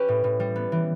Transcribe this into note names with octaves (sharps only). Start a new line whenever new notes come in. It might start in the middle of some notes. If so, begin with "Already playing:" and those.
Already playing: C#4 G4 B4 C#5
A2
A2
G3
B3
E3